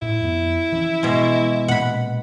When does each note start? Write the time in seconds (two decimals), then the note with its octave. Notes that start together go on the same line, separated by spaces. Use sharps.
0.02 A2 E4
0.23 F2 B3
0.72 E3 F3 C#4
1.03 B2 G#3
1.68 A#2 A#3 C#4 F#5 B5